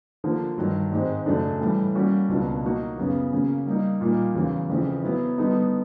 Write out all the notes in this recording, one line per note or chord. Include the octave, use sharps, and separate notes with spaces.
D3 F3 A#3
G2 D#3 F#3
G#2 D#3 G#3 C4
F#2 C#3 F#3 A3 D4
A2 E3 G3
G3 A#3 C#4 F#4
C#2 B2 F#3 A#3 D4
F#3 A#3 D#4 F#4
F#2 C#3 F#3 B3
C#3 F#3 A#3 C#4
G3 A#3 D#4
A#2 G3 A#3 D#4
E2 C#3 F#3
F2 C#3 E3
F#3 B3 E4
D3 G3 B3 D#4